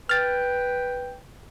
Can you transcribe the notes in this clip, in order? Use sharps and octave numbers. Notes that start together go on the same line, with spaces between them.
B4 G5 F6 A6